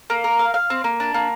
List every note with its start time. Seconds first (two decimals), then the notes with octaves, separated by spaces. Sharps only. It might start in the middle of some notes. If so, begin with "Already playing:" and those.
0.10 A#3
0.24 A#4
0.39 F5
0.54 F5
0.70 C4
0.84 A#3
1.00 D4
1.14 A#3